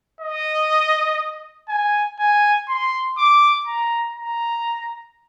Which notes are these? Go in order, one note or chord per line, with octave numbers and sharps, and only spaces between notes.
D#5
G#5
G#5
C6
D6
A#5
A#5